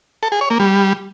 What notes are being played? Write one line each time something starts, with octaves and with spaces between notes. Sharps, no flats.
A4
G#4
C#5
A#3
G3